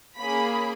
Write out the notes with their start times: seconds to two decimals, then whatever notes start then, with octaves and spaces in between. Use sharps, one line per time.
0.18 A#3 C#4 G#4 B5